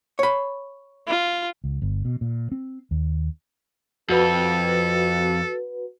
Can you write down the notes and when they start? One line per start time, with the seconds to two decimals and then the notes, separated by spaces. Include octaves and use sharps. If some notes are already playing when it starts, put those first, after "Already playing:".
0.19 C#5 B5
1.07 F4
1.64 C#2
1.82 G1
2.05 B2
2.21 A#2
2.52 C4
2.91 D#2
4.10 F2 F#4 A4 B4